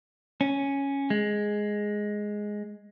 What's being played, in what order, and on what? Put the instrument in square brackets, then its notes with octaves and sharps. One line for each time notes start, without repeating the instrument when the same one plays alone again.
[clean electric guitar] C#4
G#3